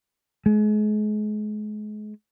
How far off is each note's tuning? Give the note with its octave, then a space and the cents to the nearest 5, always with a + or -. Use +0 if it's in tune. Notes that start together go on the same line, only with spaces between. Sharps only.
G#3 +35